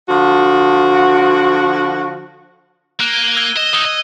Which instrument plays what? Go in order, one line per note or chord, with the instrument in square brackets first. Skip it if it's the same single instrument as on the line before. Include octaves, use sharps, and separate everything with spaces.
[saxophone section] D3 F3 F#4
[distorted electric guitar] A#3 [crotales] F#6 G7
[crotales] G#6 D#7 G7
E6 G#6 G7
[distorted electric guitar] D#5 [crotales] E7 G7
[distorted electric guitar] E2 D#4 [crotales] D#6 E6
[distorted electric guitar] D#5